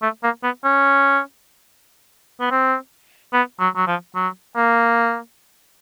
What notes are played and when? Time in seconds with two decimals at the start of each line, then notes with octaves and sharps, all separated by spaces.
0.02 A3
0.23 A#3
0.43 B3
0.64 C#4
2.40 B3
2.51 C4
3.33 B3
3.60 F#3
3.76 F#3
3.87 F3
4.15 F#3
4.56 A#3